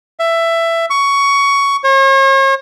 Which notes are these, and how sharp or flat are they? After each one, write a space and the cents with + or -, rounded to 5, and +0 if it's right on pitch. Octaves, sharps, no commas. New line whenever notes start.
E5 +15
C#6 +15
C#5 -40